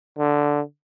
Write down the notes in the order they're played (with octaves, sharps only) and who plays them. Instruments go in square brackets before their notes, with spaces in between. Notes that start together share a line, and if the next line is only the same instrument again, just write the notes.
[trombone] D3